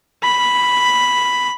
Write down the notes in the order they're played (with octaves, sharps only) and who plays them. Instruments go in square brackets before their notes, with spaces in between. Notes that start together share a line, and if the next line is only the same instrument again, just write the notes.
[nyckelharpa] B5